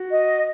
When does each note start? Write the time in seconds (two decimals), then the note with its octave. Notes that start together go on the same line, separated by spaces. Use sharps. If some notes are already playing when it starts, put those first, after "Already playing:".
Already playing: F#4
0.11 D#5